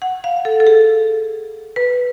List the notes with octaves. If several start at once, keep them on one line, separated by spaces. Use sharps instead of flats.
F#5
F5
A4
A4
G#4
B4